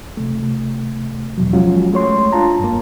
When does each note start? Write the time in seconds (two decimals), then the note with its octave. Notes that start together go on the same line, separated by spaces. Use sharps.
0.17 C3 A3
1.38 E2 B2 F#3
1.53 F3 F#3 G#3 C#4 F4 F#4
1.92 G#3 A3 C#5 C6
2.32 D4 F4 A5 A#5
2.59 G2 A#3